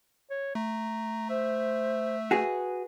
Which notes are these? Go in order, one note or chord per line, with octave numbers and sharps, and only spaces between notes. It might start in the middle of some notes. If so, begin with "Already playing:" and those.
C#5
A3 A#5
C5 E5
F#4 G#4 B4